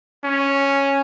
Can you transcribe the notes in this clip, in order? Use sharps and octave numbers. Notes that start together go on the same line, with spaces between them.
C#4